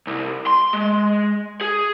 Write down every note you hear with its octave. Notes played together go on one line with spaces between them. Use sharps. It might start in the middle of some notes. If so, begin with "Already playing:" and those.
C2
C6
G#3
G#4